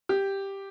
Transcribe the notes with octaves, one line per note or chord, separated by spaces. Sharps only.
G4